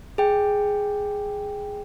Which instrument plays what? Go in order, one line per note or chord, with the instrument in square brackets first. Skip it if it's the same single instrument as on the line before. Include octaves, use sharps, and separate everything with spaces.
[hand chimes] G#4 G5